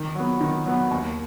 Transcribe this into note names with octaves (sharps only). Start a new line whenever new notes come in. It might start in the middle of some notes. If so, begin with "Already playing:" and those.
Already playing: D#3
F#3 B3
D#3
F#3 B3
D#2